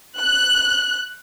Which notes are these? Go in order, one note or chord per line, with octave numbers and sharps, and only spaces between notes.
F#6